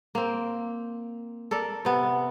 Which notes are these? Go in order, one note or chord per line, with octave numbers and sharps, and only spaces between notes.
A#3 C4
A4 A#4 D5
C3 B3